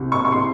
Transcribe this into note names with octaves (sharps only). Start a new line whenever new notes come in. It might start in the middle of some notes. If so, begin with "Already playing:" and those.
Already playing: C2 C3
C#6
C#6
C6